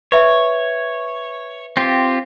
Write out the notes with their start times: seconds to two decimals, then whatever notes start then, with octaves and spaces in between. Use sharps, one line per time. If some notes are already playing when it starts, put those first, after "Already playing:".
0.12 B4 C#5 E5
1.77 C4 F4 G4